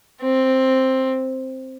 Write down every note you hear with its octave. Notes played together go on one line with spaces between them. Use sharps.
C4